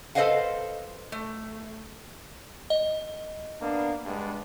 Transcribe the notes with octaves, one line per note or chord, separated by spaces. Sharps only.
A4 B4 C5 D#5 F5 F#5
A3
D#5
A#3 B3 D4
G2 G#3 B3